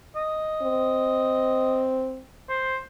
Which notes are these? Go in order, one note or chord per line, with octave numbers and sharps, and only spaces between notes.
D#5
C4
C5